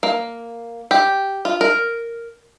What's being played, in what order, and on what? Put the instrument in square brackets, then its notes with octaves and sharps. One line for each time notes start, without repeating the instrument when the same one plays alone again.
[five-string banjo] A#3
G4
F4
A#4